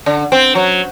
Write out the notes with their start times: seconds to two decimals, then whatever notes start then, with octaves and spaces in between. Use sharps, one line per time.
0.06 D3
0.32 C4
0.55 F#3